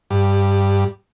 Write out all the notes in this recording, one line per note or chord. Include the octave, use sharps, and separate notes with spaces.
G2